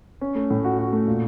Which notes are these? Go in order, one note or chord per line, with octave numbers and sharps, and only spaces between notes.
C#4
A3
A2
F#4
F#4
A3
A#2